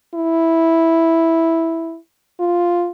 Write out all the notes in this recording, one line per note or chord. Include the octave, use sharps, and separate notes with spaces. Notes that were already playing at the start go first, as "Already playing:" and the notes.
E4
F4